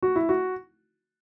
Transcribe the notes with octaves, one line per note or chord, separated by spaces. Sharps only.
F#4
E4
F#4